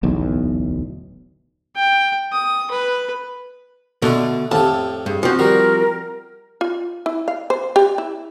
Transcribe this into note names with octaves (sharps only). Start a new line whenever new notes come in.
D1 B1 E2
G5
D#6
B4
B2 D3 A3 D4
F2 A2 G4 A5
G2 G#4
F3 C4 F#4
G3 F#4 A#4
F4
E4
F5
C5
G4
E4